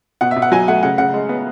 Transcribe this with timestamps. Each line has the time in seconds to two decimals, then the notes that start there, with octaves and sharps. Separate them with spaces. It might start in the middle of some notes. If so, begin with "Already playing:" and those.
0.21 B2 F#5
0.31 E5
0.36 B2
0.42 F#5
0.52 F#3 G#5
0.68 A3 F#5
0.83 C#3 F#5
0.98 C#3 F#5
1.14 G#3
1.29 B3